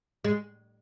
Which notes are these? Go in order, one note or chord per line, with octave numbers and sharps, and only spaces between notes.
G#3